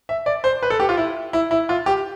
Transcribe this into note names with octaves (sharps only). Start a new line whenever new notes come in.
E5
D5
C5
B4
A4
G4
F4
E4
E4
E4
F4
G4